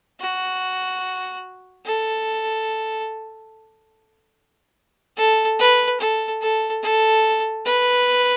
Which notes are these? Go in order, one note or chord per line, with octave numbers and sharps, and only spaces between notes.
F#4
A4
A4
B4
A4
A4
A4
B4